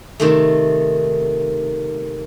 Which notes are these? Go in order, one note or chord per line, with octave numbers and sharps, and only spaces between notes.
C3 D#3 A3